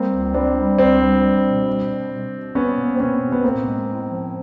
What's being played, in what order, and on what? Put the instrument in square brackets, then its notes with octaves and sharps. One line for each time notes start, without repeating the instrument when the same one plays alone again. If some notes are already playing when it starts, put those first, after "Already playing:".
Already playing: [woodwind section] G3 [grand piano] A#3 C4
[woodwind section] C#2
[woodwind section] G3 [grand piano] C4 D4
[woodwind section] G3
[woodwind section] C#2 [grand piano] C4 D4
[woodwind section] G3
G3
B2
G3
B2
B2
B2
[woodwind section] G3 [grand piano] B3 C#4
[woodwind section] A#3
[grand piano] C4
[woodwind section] B2 [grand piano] B3 C#4
[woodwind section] B2
[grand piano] B3
[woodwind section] A2 [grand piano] A#3 C4
[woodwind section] G#3
A2
F3